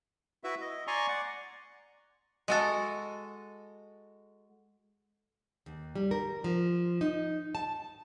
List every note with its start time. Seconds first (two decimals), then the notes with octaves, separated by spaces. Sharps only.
0.44 E4 F#4 B4 E5
0.61 D#5
0.87 D5 G#5 A#5 C6 C#6
1.08 D5 F#5
2.48 G#3 F#4 A4
5.66 D#2
5.95 G3
6.11 A#4
6.44 F3
7.01 D#4
7.55 A5